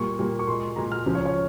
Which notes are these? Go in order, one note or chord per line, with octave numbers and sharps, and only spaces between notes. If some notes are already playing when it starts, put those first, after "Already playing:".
Already playing: A#2 G3 A#3 C#6
A#2 G3 A#3
C#6
A#2 G#3 C6
A#2 G#3 A#5
F6
C#2 C#3 F3
C#5
C#5